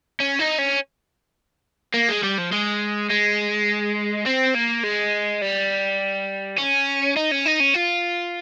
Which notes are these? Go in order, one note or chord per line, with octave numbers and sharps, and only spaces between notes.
C#4
D#4
C#4
A#3
G#3
G3
F3
G#3
G#3
C4
A#3
G#3
G3
C#4
D#4
C#4
D#4
C#4
F4